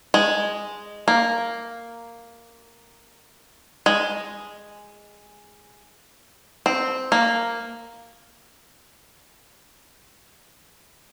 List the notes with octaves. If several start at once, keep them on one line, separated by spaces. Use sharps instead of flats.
G#3
A#3
G#3
C4
A#3